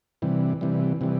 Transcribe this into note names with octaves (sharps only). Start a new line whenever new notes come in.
C3 E3 G3
C3 E3 G3
C3 E3 G3